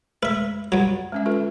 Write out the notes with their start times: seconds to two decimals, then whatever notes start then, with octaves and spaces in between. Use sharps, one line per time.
0.23 G#3 A3 B4 E5
0.72 G2 F#3 F#5
1.12 G#3 C#4 E5
1.26 F4 A4 B4